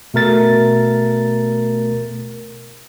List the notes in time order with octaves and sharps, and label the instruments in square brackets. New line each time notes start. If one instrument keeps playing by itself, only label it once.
[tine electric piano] B2 A3 A#4 A6